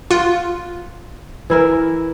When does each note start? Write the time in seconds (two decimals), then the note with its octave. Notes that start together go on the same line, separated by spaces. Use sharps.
0.11 F4 F#5
1.50 E3 E4 A#4